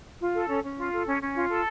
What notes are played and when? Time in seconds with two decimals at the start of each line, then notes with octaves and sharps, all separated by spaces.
0.20 F4
0.34 A4
0.49 C#4
0.64 C#4
0.77 F4
0.92 A4
1.06 C#4
1.21 C#4
1.36 F4
1.49 A4